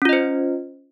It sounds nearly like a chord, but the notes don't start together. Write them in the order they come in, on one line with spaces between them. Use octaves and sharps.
C#4 F4 D#5 C5